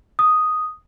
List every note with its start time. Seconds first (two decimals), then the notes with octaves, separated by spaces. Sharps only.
0.19 D#6